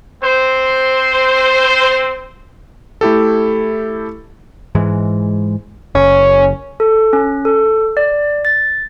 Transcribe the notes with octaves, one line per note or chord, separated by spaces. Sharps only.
C4 C5
A3 E4 G4 A4
G#2 E3 G#3
F#1 C#4
A4
C#4
A4
D5
A6